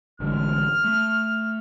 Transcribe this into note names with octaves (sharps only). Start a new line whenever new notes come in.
A1 D3 G#3 F6
A3